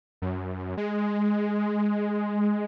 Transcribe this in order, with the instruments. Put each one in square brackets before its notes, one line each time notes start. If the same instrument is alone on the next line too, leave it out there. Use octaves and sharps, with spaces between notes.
[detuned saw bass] F#2
G#3